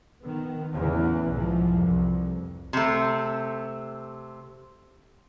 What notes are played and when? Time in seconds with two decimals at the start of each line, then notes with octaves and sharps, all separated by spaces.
0.20 D#3 B3
0.73 E2 A2 C#3 E3
1.29 B1 G#2 E3 F3
1.70 C2 F2
2.73 C3 A3